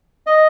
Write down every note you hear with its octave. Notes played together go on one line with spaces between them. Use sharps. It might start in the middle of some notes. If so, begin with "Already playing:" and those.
D#5